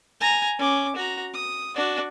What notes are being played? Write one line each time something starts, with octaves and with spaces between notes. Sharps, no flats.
G#5 A#5
C#4 D6
F#4 A#5
D#6
D4 F#4